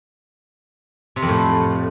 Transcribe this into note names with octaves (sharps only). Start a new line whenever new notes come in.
C3
F2
A2